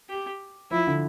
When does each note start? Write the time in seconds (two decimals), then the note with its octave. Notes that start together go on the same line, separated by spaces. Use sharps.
0.09 G4
0.71 F3 E4
0.87 D3